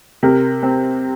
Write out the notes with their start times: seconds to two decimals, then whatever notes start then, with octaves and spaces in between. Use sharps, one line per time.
0.23 C3 A#4
0.63 C4